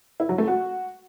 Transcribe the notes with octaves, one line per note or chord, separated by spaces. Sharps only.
E4
F#3
A3
F#4